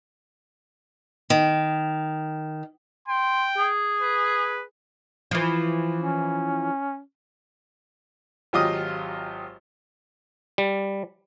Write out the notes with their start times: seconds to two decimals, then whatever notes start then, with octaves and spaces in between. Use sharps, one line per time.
1.30 D#3
3.08 G5 C6
3.58 G#4
4.01 B4
5.31 E3 F3
5.97 C#4
8.53 G#1 F#3 F4 G4 D#5 D#6
10.58 G3